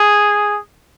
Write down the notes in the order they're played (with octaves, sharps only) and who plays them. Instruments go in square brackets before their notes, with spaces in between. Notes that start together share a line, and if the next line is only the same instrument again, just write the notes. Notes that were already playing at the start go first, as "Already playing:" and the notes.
Already playing: [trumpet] G#4